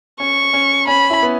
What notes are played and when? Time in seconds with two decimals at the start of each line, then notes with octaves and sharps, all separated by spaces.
0.20 C#4 C#6
0.53 C#4
0.87 C#4 B5
1.10 E4
1.23 B3